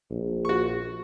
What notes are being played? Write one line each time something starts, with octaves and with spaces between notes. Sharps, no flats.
A#1
F#4 C#6